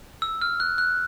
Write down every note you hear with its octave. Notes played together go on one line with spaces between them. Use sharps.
E6
F6
F#6
F#6